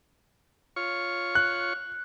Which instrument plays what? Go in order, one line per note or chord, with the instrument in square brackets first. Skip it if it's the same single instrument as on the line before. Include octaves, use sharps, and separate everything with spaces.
[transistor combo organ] F4 C#5 C#6
[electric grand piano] F#6